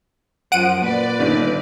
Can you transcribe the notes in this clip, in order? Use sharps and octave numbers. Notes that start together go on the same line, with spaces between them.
F#2 F3 F#5 D7 D#7
A#2 B4 D5
G1 D#3 D4